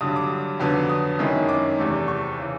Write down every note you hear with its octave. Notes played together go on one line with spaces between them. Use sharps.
G2 D3 F#3 D#6
D6
F2 D3 F#3 B3
D#6
F#2 D#3 G#3 C#4 E4
D6
E2 C3 E3 A3
C#6
C#3 E3